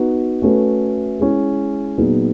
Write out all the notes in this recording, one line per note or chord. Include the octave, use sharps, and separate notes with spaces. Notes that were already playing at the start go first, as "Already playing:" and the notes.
Already playing: B3 D#4 F#4 B4
A3 C#4 F#4 B4
G#3 C#4 E4
A#2 F#3 B3 D#4 G#4